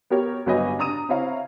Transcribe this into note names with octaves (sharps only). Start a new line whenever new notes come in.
B3 G4 A#4 C#5
G1 F#3 B4 C#5 D#5 G#5
D4 A#5 D#6 D#7
C4 E4 C#5 F5 A#5